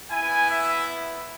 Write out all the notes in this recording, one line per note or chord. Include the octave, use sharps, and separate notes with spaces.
B3 E4 G#5
E5